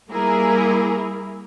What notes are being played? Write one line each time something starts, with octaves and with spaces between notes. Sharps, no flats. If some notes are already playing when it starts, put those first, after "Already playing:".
G3 A#3 E4 G#4 A#4